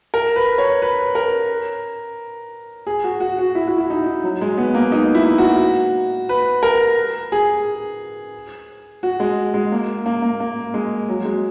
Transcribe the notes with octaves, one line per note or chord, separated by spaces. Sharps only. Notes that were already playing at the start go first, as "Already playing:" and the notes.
A#4
B4
C#5
B4
A#4
G#4
F#4
F#4
F#4
E4
F#4
E4
D#4
D#4
F#3
G#3
B3
A#3
D#4
E4
F#4
B4
A#4
G#4
F#4
G#3
G#3
A#3
A#3
A#3
A#3
G#3
F#3
G#3